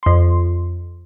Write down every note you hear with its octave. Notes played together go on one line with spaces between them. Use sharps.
F2 C6